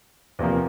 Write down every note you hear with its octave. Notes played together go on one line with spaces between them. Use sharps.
E2 C3 F3 A#3